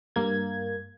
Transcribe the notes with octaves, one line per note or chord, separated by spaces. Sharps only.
G2 A#3 G#6